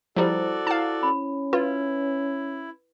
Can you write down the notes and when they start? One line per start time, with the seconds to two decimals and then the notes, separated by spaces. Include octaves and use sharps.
0.16 F3 G3 E4 F#4 A4 C5 D5
0.67 E4 F5 A5
1.03 C#4 B5
1.53 E4 F4 B4